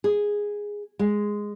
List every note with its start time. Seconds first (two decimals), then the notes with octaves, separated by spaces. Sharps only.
0.04 G#4
0.99 G#3